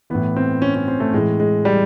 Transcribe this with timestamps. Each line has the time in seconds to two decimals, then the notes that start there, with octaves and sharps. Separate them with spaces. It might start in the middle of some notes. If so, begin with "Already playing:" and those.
0.10 A2 E3 B3
0.36 C4
0.62 C#4
0.75 C#4
0.88 C4
1.00 A3
1.14 A2 E3 G#3
1.40 G#3
1.65 G3